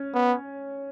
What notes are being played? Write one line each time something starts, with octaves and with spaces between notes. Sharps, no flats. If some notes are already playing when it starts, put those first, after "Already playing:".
Already playing: C#4
B3